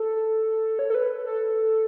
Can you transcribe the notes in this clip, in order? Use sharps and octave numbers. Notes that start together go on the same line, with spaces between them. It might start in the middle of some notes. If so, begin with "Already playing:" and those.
Already playing: A4
C#5
A4
B4
A4